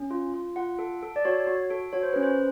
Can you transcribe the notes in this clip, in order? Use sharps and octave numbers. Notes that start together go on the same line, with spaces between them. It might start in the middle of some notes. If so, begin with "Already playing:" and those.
Already playing: C#4
F4
F4
F4 F#5
A4
A4
D5
F#4 C#5
F#4
A4
F#4 C#5
C5
C#4 B4
C5